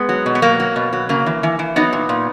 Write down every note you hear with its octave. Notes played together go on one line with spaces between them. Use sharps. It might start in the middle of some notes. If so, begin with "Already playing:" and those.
Already playing: G#3 B3
F#3
B2
B3
F#3 A#3
F#3
B2
F#3
C#3 A#3
E3
E3
E3
F#3 B3 D#4
A#2
A#2